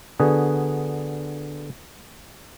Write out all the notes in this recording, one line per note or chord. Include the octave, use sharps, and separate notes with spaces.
D3 B3 F#4 G#4